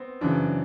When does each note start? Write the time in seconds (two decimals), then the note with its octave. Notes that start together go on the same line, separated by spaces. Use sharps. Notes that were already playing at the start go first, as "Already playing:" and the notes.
Already playing: B3 C4
0.21 F#2 C#3 E3 D4